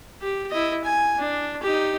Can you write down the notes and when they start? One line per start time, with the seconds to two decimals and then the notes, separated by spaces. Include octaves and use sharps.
0.21 G4
0.50 E4 D#5
0.84 G#5
1.19 D4
1.63 D#4 G4